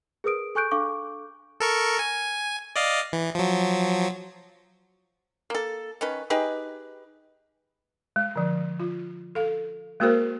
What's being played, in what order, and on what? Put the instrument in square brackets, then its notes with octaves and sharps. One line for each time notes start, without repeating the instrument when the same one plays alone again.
[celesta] G#4 A#4 B4 D#6 D7
A4 G#5 C#6 F#6 G6 D7
D4 A4 F5 C#6 D6
[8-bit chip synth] A4 A#4 C#6
G#5
D5 D#5 F5
E3
F3 F#3
[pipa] A#3 A4
D#3 C#4 B4
D#4 G4 G#4 B4
[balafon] G#3
D3 F3
F4
A4 F5
G#3 A#3 F#4 G#4 A#4 C5